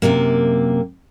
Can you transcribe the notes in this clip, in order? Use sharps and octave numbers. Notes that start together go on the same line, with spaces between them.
F#2 A2 C3 A#3